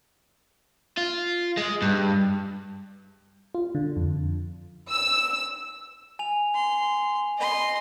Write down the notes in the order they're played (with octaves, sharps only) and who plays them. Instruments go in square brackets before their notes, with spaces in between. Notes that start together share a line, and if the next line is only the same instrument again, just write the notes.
[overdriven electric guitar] F4
G#3
G2
[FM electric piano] F4
D3
F2
[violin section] E6
[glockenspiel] G#5 F7
[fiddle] C6
D#5 C6